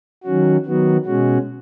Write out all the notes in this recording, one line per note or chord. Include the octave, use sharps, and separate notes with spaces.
D#3 F#3 C#4 F#4
D#3 F#3 B3 F#4
B2 G#3 C#4 F#4